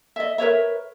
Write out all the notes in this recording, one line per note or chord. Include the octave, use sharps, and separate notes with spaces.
D#5 E5
A#4 B4 C#5 E5